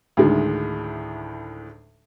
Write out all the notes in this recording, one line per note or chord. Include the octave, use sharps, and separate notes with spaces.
D2 A2 D#3 G#3